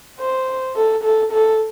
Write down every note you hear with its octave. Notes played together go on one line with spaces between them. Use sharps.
C5
A4
A4
A4